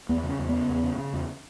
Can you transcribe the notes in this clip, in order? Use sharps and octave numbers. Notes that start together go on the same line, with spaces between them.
E2 B3
C#3
C#4
E2
C#3 B3
E2
C#3
C#3
E2